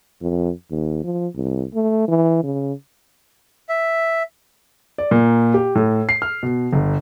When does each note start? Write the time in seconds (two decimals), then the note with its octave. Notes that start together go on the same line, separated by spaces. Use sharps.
0.22 F2
0.70 D#2
1.04 F3
1.35 C2
1.74 A3
2.08 E3
2.44 C#3
3.69 E5
4.98 D5
5.11 A#2
5.54 G4
5.75 A2
6.09 C7
6.22 F6
6.43 B2
6.73 G1